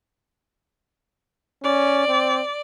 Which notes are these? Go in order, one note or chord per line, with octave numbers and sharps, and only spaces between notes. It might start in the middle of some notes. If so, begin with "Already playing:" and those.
C#4 D5
C4